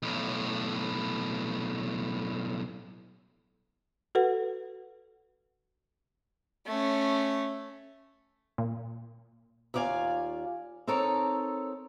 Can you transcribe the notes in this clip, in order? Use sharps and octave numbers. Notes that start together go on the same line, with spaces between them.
B1 A2
F#4 A4 B4 F#5
A3 C#4
A#2
D#2 F4 D5 F5 G#5
C4 D#4 A4 A#4 C#5